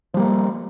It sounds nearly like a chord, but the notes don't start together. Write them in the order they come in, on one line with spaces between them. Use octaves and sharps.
F3 G3 A#3